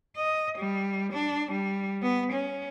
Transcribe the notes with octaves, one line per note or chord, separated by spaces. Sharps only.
D#5
G3
D4
G3
B3
C#4